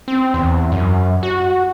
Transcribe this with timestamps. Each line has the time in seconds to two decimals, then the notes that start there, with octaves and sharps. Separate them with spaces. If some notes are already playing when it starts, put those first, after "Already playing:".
0.08 C4
0.34 E2
0.72 F#2
1.23 F#4